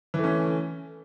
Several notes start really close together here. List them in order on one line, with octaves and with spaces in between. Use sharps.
E3 A3 C#4